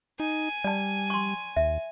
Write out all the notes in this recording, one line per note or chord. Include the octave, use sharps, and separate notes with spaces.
D#4 G#5
G3 D5 A5
C6 C#6
D#2 E5